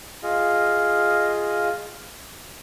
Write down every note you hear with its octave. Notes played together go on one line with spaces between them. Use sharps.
F4 G#4 D#5 F5